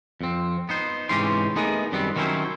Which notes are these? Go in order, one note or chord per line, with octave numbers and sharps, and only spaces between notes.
F2 C4
B3 D#4 C5
G#2 C3 E3 C#4 G4 C6
A3 B3 D#4 G#4 A#4
F#2 D#3 G3 B3 C4
D#3 F#3 C#4 D4 E4 C5